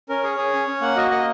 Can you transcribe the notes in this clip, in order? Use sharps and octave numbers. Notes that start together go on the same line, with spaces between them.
C#4 A#4
G#4 C#5
G#4
C#4
C#4
A#3 F#5
F#4 D#5
A#3 D#5